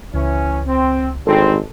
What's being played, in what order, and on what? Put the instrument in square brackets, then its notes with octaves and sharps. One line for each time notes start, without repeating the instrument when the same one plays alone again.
[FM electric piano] C#2 [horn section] E3 C#4
[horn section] C4
[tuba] G#1 [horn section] D3 G3 C4 [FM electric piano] A4